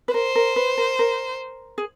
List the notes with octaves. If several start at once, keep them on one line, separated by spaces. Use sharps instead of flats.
B4
A#4 C5
A#4
B4
A#4
A#4
G#4